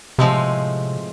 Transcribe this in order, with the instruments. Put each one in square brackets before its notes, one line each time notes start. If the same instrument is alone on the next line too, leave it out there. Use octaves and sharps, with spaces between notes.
[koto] A2 F3 G#3 C4 [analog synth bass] C3